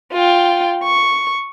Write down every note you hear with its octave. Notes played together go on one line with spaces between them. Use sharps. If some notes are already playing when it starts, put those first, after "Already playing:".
F4 G5
C#6